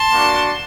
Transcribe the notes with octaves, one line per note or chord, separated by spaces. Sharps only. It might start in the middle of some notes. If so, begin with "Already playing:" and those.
Already playing: A5 C6
A#3 D4 F#4